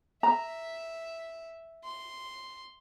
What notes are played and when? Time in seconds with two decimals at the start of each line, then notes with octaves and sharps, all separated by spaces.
0.23 E5 A#5
1.85 C6